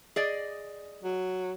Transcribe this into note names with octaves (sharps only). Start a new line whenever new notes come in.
G#4 D5 D#5
F#3